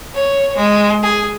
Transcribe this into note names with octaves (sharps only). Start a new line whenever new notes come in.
C#5
G#3
G#4